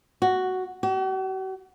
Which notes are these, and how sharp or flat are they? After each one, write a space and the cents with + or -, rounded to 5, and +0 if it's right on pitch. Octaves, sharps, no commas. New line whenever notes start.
F#4 +5
F#4 +45